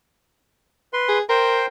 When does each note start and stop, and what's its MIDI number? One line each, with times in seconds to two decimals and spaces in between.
0.93 1.18 71
0.93 1.18 84
1.08 1.22 68
1.29 1.66 70
1.29 1.66 72
1.29 1.66 79
1.29 1.66 84